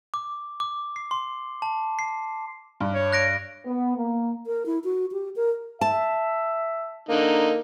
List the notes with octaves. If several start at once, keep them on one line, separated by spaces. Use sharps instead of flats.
D6
D6
C7
C6
A5
C7
G2
C#5
F#6 A#6 D7
B3
A#3
A#4
E4
F#4
G4
A#4
E5 A5
D3 A#3 D#4